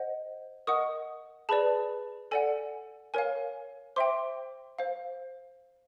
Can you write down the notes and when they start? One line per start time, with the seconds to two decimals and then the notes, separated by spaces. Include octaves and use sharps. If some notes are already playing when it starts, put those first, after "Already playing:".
Already playing: C5 D#5 F#5
0.67 A#4 D#5 F#5 C#6 D#6
1.49 G#4 B4 D5 A5 B5
2.31 A4 D5 F#5 G#5
3.14 A#4 C#5 F5 G#5
3.96 C5 E5 G5 C6 D6
4.79 C5 F5